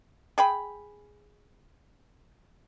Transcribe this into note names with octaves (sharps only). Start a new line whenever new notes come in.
G#4 G5 B5